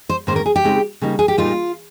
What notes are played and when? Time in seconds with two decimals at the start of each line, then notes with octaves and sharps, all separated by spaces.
0.09 C5
0.27 G#2 D#3 A#3 C#4 C5
0.36 A#4
0.46 G#4
0.56 G4
0.64 C#3 G#3 C4 D#4
1.02 C#3 G3 A#3 D#4
1.19 G#4
1.28 G4
1.38 A#2 G3 A#3 D#4 F4